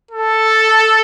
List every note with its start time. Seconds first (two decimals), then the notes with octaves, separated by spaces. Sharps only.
0.11 A4